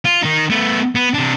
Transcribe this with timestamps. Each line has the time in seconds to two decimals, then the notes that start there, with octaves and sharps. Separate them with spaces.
0.05 F4
0.22 D#3 D#4
0.50 A3 B3
0.95 B3
1.14 C3 D4